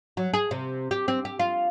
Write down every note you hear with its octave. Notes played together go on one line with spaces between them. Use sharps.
F#3
G#4
C3
G4
C4
G4
F4